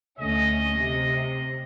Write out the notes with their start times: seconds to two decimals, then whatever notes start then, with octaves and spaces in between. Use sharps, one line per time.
0.19 D2 A3 C#4 D#5
0.75 C3